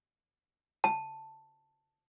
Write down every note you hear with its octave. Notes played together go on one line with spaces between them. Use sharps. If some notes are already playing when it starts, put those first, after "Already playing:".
A5